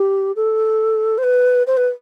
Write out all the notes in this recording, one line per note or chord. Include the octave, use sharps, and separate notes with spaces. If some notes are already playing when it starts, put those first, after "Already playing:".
Already playing: G4
A4
C5
B4
C5
B4